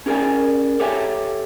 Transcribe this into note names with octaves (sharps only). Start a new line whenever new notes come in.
C#4 G#4 A#4 D5 G#5
G4 A4 C#5 E5 G5 G#5